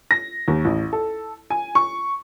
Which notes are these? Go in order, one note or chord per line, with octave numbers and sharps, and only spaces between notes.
A#6
D#2
A1
A4
G#5
C#6